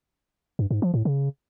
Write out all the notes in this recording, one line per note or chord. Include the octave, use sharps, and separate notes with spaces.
G2
G#2
F3
A2
C#3